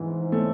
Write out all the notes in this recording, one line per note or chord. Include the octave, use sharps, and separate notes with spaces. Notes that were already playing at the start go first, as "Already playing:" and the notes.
Already playing: G#2 E3
A3